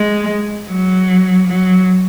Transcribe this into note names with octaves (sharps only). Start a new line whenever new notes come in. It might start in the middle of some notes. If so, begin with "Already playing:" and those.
Already playing: G#3
F#3
F#3